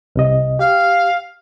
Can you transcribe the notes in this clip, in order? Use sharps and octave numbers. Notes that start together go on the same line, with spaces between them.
C2 C3 D#5
G4 F5